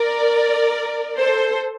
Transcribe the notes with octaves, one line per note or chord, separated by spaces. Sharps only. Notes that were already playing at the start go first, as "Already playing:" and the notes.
Already playing: A#4 D5
A4 C5